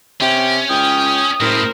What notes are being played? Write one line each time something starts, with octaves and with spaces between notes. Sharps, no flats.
C3 C#4 G5
C#2 G5 D#6
F#1 A2 A#4 C5